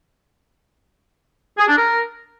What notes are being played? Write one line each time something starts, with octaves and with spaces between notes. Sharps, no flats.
G#4
D4
A#4